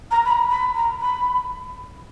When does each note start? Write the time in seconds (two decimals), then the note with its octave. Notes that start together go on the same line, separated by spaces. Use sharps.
0.11 A#5
0.26 B5
0.31 A#5
0.50 B5
0.75 A#5
1.01 B5